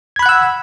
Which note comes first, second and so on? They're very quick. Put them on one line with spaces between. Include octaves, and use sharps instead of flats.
G#6 B5 F#6 F#5 E6